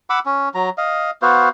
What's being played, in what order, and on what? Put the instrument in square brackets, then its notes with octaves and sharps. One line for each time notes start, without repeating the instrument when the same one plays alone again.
[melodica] F#5 B5 D6 E6
C#4
F#3 A#5
D#5 F5
B3 F#4 C5 F5